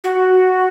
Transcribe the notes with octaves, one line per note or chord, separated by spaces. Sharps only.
F#4